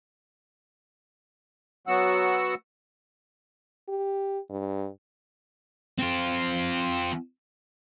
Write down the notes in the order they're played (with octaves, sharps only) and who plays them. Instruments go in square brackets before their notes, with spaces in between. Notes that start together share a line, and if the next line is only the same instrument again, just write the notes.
[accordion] F#3 B3 F#4 F#5 E6
[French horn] G4
G2
[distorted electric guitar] C4 F4